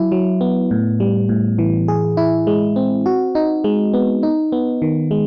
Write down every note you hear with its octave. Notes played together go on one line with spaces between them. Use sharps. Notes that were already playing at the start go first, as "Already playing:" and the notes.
Already playing: F#3 E4
F#3
B3
A2
G3
A2
E3
G#4
E4
G#3
C4
F#4
D#4
G#3
B3
D#4
B3
D#3
G#3